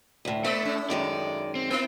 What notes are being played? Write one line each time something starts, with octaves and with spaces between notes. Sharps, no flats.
D2 A2
A3 A#3 D5 E5
A2 C#4
F#2 D#3 G#3 D5
C4
A#3 C4 E4